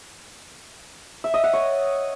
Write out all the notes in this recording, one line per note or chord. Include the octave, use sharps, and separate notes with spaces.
E5
D#5
F#5
C#5